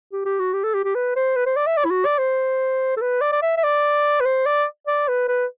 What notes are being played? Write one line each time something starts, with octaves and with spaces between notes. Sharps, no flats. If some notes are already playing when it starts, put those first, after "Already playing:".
G4
G4
F#4
G4
A4
G4
G4
B4
C5
B4
C5
D5
E5
D5
E4
F#4
D5
C5
A4
B4
D5
D5
E5
E5
D5
B4
C5
D5
D5
B4
B4